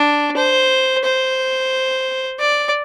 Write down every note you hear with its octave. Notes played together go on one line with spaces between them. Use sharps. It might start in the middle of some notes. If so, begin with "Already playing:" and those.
Already playing: D4
C5
C5
D5